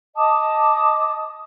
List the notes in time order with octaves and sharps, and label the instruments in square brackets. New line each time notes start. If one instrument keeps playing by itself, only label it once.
[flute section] D#5 A5 D6 D#6